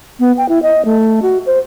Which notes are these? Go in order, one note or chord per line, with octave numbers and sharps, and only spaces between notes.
B3
G5
E4
D#5
A3
F#4
C5